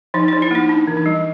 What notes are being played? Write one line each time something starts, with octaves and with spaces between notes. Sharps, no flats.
F3 D#4
F3 D#4
E4
A#3 D#4
D4 D#4
E3
D#4
G3